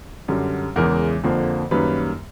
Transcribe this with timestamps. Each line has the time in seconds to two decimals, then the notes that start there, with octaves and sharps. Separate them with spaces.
0.28 F#2 D3 G3
0.76 E2 C#3 E3 G#3 A#4
1.23 F2 D3 F3 A#3
1.71 F#2 D#3 G3 A#3 B4